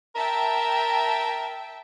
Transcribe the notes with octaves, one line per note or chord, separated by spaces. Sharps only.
A#4 E5 G5 A5